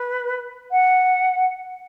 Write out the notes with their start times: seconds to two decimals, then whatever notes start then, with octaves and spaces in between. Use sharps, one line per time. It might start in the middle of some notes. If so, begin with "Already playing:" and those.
Already playing: B4
0.71 F#5